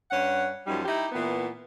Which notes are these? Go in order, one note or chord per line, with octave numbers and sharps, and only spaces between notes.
G2 C#4 F#5
F#2 F3 G3 D#4
D#4 E4 G4
A#2 E3 B3